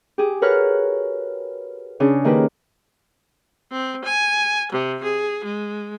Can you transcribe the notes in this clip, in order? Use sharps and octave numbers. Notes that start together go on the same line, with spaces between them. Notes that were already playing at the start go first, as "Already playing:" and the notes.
G4 G#4
F#4 A#4 B4 C#5 F6 F#6
C#3 D4 C#5
D#3 A#3 G4 B4
C4
G#5
C3
G#4
G#3